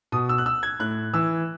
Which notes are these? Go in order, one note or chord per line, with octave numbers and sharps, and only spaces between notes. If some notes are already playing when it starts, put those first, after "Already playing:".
B2 D#6
E6
F#6
E6
G#6
A2 F#6
E3 E6